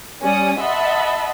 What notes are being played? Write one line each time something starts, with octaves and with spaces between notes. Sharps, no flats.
G3 C#4 D5 D#6
D#5 E5 F#5 A5 B5 C6